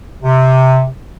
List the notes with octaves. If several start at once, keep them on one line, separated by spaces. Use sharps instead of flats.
C3